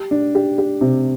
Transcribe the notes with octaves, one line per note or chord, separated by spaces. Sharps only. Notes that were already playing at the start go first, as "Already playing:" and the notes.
Already playing: G4
D4
G4
G4
C3